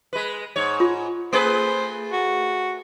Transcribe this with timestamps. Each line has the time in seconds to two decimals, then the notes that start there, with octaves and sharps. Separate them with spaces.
0.13 G#3 B4
0.56 G#2 C#5
0.80 F4
1.33 A3 G#4 B4 C5
2.12 F#4